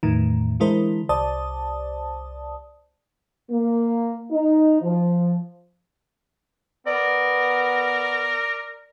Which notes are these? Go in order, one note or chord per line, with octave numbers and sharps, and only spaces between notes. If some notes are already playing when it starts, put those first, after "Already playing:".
E2 A2 D#3
D3 E3 G#3 E4 A#4 C5
C2 C5 D5 A5 D#6
A#3
D#4
F3
B3 A#4 D5